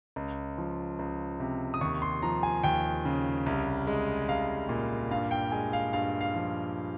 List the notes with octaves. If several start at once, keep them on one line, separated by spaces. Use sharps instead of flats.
C#2
F3
C#2
C3
D#6
D#2 C#6
C6
F3 A#5
G#5
D#2 G5
C#3
C2
G#3
C2 F5
A#2
G2 F5
G5
G#3 G#5
F5
G2 F5
F5
F3